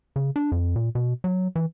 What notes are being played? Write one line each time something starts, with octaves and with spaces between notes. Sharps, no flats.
C#3
D4
F2
A#2
B2
F#3
E3